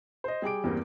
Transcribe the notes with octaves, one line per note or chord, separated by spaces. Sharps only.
C5 D#5
G3 G#4 G5 D6 D7
E2 G2 G3 A#3 C4